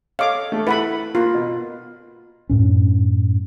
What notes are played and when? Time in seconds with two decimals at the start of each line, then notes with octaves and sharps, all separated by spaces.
0.19 A4 C#5 D#5 F5 D6
0.52 A3 A4
0.67 E4 A4 B4 F#5 B5
1.15 A#3 F4
1.34 B2
2.49 F#2 A2 C#4